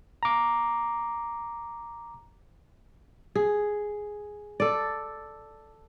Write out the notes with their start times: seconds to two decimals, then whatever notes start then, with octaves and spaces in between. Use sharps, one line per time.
0.23 A#5 D6
3.35 G#4
4.60 A4 D5